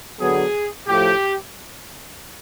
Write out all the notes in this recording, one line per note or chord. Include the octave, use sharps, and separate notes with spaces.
D3 F#3 B3 G#4
A2 F3 A3 G4